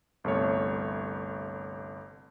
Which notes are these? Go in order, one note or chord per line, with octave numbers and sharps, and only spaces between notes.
G1 C2 A3 C#5